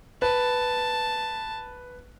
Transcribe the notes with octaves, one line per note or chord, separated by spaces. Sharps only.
B4 A5